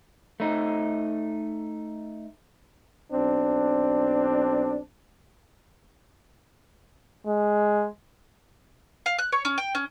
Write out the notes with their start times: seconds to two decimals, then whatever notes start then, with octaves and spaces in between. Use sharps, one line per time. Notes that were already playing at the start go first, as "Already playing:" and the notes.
0.40 A3 D#4
3.12 B1 C4 D4
7.27 G#3
9.06 F5
9.18 F#6
9.32 C#5
9.45 C#4
9.58 G5
9.75 C#4